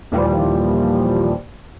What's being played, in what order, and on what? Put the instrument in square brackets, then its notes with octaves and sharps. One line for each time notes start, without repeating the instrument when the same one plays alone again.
[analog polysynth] D#2 A#2 E3 F3 G3